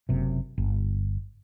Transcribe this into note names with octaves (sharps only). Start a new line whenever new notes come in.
F#1 F#2 C3
G1